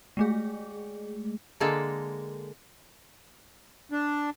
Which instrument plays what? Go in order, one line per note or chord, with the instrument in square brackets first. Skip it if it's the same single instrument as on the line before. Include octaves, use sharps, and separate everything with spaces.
[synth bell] G#3 A3 G#4
[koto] D3 G#3 A#3 A4
[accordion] D4